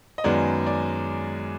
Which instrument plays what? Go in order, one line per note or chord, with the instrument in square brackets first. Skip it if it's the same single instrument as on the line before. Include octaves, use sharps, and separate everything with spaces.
[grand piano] D#5
F#2 D#3 G#3 B3 D5
D5